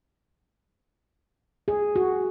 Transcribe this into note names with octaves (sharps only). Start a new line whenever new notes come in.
G#4
F#4